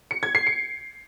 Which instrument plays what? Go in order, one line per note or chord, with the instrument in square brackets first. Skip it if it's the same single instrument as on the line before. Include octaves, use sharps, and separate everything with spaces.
[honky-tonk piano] C#7
G#6
C7
C#7